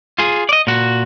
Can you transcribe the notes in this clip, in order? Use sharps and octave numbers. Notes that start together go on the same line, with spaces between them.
F4 G#4
D5 D#5
A#2 F#4